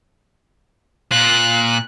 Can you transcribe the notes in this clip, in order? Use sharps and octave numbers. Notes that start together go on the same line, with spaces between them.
A#2 F4 F#6